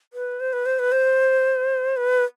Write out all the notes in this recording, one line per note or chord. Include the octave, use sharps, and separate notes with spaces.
B4
C5
B4
C5
B4
C5
B4